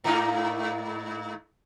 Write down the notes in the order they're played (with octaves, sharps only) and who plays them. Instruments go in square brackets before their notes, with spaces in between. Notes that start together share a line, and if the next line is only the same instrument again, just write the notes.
[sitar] G#2 A#3 D#4